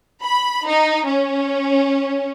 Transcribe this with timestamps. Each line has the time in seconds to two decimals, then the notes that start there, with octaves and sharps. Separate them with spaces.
0.24 B5
0.69 D#4
1.06 C#4